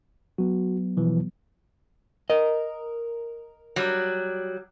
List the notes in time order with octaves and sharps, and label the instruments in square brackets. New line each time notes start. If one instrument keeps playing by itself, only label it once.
[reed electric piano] F#3 B3 [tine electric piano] F#4
[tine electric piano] B2 E3 F3
[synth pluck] A#4 [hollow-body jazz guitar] D#5
[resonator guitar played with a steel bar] F#3 G3